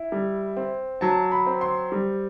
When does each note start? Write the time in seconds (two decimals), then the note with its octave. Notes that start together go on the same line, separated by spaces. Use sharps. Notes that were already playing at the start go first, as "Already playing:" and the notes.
Already playing: E4
0.12 G3
0.57 C4
1.01 F#3 A5
1.32 B5
1.46 C4
1.61 C6
1.92 G3